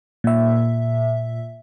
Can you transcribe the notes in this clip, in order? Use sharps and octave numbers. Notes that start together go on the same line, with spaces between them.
A#2 E5